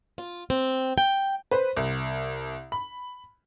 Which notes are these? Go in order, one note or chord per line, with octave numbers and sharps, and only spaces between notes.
F4
C4
G5
B4 C5
C2
B5